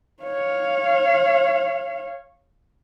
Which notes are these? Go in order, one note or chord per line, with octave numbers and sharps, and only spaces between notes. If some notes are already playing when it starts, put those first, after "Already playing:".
C#5 F5